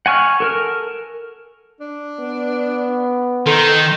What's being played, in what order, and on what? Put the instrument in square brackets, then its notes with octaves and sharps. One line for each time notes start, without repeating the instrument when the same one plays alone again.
[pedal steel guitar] F#5 G#5 C#6 F6
A4 A#4 F6
[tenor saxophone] D4
[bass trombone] B3
[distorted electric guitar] D#3 [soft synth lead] A4 [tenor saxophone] C5